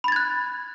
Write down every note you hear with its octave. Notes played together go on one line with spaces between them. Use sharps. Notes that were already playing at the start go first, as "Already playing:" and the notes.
B5 F#6 G#6 A6